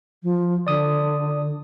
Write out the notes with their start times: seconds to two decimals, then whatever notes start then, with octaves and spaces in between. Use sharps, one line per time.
0.23 F3
0.67 D3 D5 D#6